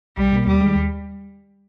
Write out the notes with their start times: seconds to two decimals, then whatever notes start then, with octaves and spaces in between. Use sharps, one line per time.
0.17 B1 G3
0.32 B2 A#3
0.47 D#2 G3
0.61 D#3 G#3
0.75 D#2